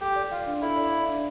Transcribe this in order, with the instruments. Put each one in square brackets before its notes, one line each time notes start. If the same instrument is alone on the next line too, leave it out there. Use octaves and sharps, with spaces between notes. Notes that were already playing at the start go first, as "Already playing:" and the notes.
[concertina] G4 [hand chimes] A4
[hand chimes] D5
[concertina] F4 [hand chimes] F5
[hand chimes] D4
[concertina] E4 [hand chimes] A4
[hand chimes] D5
F5
D4